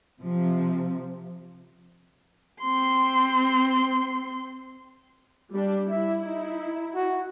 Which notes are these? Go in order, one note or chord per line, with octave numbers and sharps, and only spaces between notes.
C3 F3
C4 C6
G3 D4
E4 E5
D#4
F#4